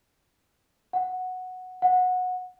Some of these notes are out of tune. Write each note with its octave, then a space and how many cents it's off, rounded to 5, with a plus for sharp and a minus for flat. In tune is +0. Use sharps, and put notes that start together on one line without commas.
F#5 -5
F#5 -20